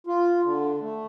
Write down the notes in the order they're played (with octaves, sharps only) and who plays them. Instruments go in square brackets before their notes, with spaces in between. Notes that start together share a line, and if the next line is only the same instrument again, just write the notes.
[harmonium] F4
D3
A3